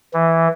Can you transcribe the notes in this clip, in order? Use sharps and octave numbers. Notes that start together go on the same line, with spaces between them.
E3